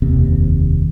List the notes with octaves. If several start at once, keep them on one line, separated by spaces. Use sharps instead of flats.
F1 D#2 C3